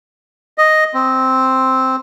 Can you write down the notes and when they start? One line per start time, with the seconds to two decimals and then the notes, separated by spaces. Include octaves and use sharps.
0.58 D#5
0.94 C4